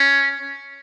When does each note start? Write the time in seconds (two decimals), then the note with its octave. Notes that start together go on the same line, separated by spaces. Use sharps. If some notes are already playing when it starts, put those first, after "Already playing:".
Already playing: C#4